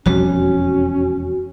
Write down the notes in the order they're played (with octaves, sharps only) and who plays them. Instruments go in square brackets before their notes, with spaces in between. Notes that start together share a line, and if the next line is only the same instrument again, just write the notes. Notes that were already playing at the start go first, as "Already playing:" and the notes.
[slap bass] E1 F2 G3 [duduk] C#4 [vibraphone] F#4